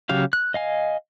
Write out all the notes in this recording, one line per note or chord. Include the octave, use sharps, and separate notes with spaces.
C#3 F#3 G4 F5
F#6
D#5 F5 G#5